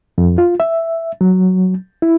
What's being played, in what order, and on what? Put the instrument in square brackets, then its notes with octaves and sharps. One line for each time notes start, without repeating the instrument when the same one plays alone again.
[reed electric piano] F2
F4
E5
F#3
E4